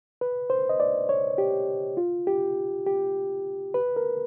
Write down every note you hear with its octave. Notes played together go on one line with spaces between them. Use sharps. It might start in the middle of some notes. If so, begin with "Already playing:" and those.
B4
C5
D#5
D5
C#5
G4
F4
G4
G4
B4
A#4